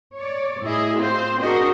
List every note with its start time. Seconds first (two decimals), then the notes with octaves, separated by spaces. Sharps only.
0.15 C#5 D5
0.64 A2 E4 G#4 D#5
0.99 C4 F4 C5
1.40 D4 F#4 G#4 A#4 C5 D#5